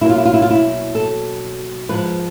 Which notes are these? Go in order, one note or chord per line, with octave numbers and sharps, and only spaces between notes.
B2 F#3 A#3 E4
F4
E4
F4
E4
F4
E4
A4
G#2 F3 G#3 B4